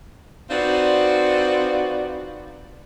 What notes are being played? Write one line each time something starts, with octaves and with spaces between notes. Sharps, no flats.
C4 D#4 F4 F#4 B4 D5